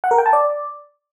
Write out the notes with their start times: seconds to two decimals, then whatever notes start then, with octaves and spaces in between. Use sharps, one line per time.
0.04 F#5
0.11 A#4
0.18 G5
0.26 A5
0.33 D5